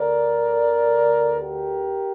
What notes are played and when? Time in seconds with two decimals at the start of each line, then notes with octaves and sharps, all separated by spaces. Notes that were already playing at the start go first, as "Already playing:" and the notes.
Already playing: D2 D3 A#4 D5
1.38 G4 A#4